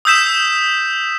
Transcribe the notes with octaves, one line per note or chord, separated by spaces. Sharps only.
D#6 E6 G6 B6 E7